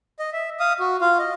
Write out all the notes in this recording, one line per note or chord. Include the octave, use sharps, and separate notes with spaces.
D#5
E5
F5 D#6
F#4
F4 F5
D#5